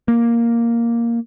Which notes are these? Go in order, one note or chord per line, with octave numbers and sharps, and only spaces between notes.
A#3